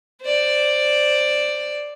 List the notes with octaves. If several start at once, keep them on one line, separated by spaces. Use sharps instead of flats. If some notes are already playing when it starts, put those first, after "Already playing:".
C5 D5